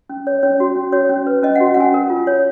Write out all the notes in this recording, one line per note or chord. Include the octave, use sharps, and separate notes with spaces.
C#4
C#5
C#4 C#5
F#4
C#4
F#4 C#5
C#4
B4
C#4 D#5
F#5
F#4
F#5
C#4 G#5
A#4
F4
C#5